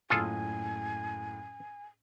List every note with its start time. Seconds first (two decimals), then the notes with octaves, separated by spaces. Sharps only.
0.10 F#1 A2 F4 G#4 A4 G#5 D#6